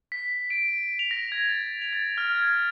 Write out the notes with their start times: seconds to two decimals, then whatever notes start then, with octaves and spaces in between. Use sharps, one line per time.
0.12 B6
0.50 D7
0.99 F7
1.11 A#6
1.32 G#6
1.49 A6
1.82 F7
1.93 A6
2.18 F6
2.35 G#6